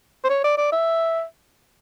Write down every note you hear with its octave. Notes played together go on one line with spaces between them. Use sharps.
C5
C#5
D5
D5
E5